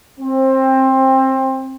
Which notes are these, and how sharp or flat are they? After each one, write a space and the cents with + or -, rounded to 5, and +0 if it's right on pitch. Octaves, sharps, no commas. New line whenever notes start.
C4 +20